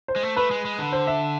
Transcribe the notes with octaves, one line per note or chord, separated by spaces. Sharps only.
C5
G#3
A3
A3 B4
G#3
G#3
D3
C5
E5